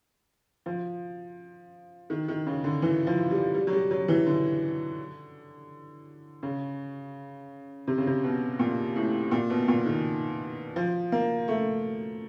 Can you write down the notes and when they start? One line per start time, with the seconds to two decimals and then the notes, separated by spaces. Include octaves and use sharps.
0.66 F3
2.10 D#3
2.28 D#3
2.47 C#3
2.64 D3
2.82 E3
3.07 F3
3.30 G3
3.55 G3
3.67 F#3
3.73 G3
3.91 F#3
4.08 E3
4.26 D3
6.43 C#3
7.87 C3
7.98 C#3
8.07 C3
8.24 B2
8.59 A#2
8.96 A2
9.31 A#2
9.50 B2
9.68 A#2
9.86 D#3
10.76 F3
11.12 A#3
11.48 A3